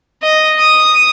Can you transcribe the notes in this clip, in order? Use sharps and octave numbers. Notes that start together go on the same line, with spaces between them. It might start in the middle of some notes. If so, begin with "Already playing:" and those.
D#5
D#6